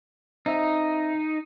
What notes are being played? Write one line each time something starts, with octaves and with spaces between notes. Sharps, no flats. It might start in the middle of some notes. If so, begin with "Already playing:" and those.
C4 D#4 E5